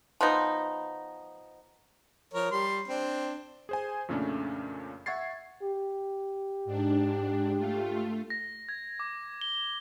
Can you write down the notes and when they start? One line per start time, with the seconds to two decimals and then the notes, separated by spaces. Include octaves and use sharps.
0.21 F3 B3 D#4
2.34 F3 A#4 C#5
2.51 G3 C6
2.88 C4 D4
3.69 G#4 C5 G#5
4.08 F2 A#2 C#3 A3 C#4 D4
5.06 E5 F#5 C#6 G#6 A6 C7
5.62 G4
6.65 G#2 D4
7.57 A3 F4
8.30 A#6
8.69 G#6
9.00 D6
9.41 G7